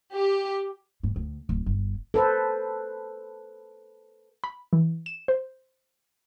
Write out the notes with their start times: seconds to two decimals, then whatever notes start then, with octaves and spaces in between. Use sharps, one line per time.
0.14 G4
1.03 G#2
1.16 D2
1.49 D1
1.66 G1
2.14 A4 B4 C5
4.44 B5
4.73 E3
5.06 E7
5.28 C5